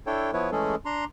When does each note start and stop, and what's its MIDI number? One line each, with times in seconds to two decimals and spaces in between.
0.07 0.31 62
0.07 0.31 64
0.07 0.31 69
0.07 0.31 73
0.07 0.31 79
0.33 0.50 53
0.33 0.50 59
0.33 0.50 64
0.33 0.50 71
0.33 0.50 73
0.52 0.75 52
0.52 0.75 56
0.52 0.75 57
0.52 0.75 61
0.52 0.75 68
0.52 0.75 69
0.85 1.05 62
0.85 1.05 82
0.85 1.05 84